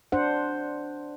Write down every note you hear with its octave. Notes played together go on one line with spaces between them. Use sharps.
D4 C5 F#5